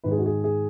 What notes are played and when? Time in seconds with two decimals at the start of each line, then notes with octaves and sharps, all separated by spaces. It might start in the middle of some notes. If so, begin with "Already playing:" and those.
0.04 G#2 D#3 B4
0.11 G#4
0.18 F#4
0.26 G#4
0.44 G#4